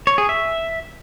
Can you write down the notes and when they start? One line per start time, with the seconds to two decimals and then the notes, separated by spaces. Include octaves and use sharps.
0.07 C#5
0.18 G#4
0.29 E5